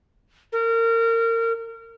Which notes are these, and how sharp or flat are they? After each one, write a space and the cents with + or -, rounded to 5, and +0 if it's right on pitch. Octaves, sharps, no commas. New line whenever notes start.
A#4 -30